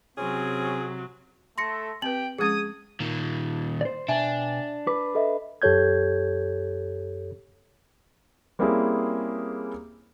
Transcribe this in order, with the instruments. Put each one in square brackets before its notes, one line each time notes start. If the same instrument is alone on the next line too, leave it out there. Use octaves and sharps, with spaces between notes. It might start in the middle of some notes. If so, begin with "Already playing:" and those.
[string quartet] C3 F#3 [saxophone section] C4 C#4 G#4
[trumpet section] A3 A4 [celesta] C6 A#6 C#7
[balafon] C4 B4 [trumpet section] G4 G5 [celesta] F#7
[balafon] F3 G#3 C#4 [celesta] G#4 G#6 [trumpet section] D#6
[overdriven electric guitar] A#2 D#3
[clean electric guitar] C5 D5
[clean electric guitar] B2 G5 G#5 [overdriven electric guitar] D4 [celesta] E5
[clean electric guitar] B4 [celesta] D6
[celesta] A4 D#5 E5
[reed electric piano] F#2 G4 A4 C#5 G6 G#6
[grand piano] G3 A#3 C4 C#4 E4 G#4